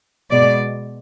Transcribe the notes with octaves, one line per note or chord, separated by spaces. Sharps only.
B2 G#3 D5